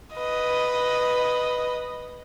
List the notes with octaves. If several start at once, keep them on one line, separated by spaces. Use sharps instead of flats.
B4 D#5